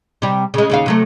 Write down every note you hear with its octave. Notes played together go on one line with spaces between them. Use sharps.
C3 G3
C#3 G#3
D#2 C#3 F5
C3 F#3 A3